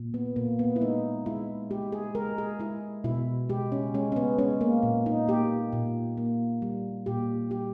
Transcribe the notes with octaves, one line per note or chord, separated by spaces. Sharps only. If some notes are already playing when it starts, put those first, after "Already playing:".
Already playing: A#2
B3
A#2 A#3
B3
E4
G#3 D#4
G#3 E4
G#3 G4
G#4
G#3 A#4
G#4
G#3 E4
B2 E4
G#3 G4
C#4
G#3 C#4
C#4
B3
G#3 C#4
A#3
A#2
D#4
A#3 G4
A#2
A#3
G3
A#2 G4
G3 G4